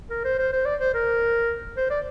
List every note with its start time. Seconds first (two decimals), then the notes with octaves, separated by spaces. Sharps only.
0.10 A#4
0.24 C5
0.39 C5
0.53 C5
0.65 D5
0.80 C5
0.94 A#4
1.77 C5
1.90 D5